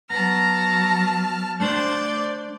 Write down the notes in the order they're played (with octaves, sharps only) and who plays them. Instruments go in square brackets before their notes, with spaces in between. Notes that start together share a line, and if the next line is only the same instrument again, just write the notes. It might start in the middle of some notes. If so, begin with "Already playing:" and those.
[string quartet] F#3 A5 F6 [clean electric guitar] B3 [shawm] A#5
[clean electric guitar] A3 D4 C5 [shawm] D5 [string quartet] G6 A6